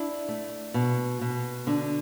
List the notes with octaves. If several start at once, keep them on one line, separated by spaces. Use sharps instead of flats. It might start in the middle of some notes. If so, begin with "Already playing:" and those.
Already playing: D4 E4
A3
B2
B2
D3 D4